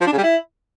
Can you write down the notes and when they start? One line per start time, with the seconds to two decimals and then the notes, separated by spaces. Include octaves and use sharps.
0.01 F3
0.07 D4
0.12 C#3
0.18 G3
0.23 E4